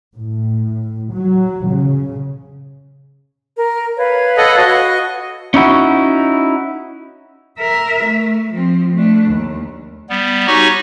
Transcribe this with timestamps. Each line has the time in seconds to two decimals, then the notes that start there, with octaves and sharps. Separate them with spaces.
0.15 A2
1.12 F#3
1.67 C#3
3.58 A#4
3.97 B4 C#5 F5
4.38 A4 D#5 F#5
4.58 F#4 D#5
5.54 C#4 D#4 E4 F#4
7.60 A#4 E5
8.04 A3
8.53 F3 C4
8.94 A3 D4
9.27 D#2
10.10 G3 B3
10.47 D#4 F#4 G4 C#5 G#5 C#6